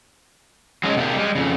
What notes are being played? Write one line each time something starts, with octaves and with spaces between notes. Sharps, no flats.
F#3 G#3 C#4 D#5
C3 A#3 D4 G4 G#4
G3 G#3
F2 C#3